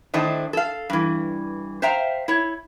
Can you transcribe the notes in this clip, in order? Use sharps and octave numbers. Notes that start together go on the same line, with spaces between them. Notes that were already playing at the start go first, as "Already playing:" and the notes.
A2 D#3 A3 D4 C5 D#5
A4 F5
G2 E3
C5 E5 F5 G5 A#5
E4 C#5